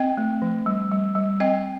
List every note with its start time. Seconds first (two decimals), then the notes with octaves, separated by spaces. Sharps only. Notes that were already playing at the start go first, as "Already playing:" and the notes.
Already playing: C4 D#5 G5
0.17 A3
0.42 F3
0.66 G3
0.91 G3
1.15 G3
1.40 C4 D#5 G5